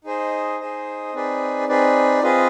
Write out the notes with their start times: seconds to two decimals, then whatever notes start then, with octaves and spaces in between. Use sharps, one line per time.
0.04 D#4 G#4 C5 D#5
0.60 D#4 G#4 C5 D#5
1.13 C4 D#4 G#4 B4 D5
1.68 C4 D#4 G#4 B4 D5
2.23 C4 F4 G#4 B4 D#5